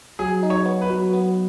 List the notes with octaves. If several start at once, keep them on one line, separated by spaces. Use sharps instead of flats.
F#3 G#4
D#4
C#5
B3
B4
F#3
B3